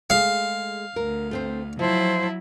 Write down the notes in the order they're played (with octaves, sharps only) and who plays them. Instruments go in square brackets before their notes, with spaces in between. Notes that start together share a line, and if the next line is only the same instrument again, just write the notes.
[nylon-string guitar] G#3 A3 G#4 [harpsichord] F5
[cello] D2 [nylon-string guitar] A#4
[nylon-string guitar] A3 C4 C5
[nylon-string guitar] F3 [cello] F#3 E4 [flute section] C5 A5